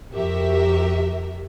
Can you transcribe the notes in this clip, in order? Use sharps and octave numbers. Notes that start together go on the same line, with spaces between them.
F2 F#4 G4 A#4 E5